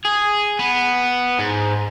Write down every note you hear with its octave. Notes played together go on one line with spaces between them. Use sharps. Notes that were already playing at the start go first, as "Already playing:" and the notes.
G#4
B3
G#2